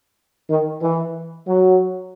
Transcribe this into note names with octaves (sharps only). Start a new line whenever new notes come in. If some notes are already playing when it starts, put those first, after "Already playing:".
D#3
E3
F#3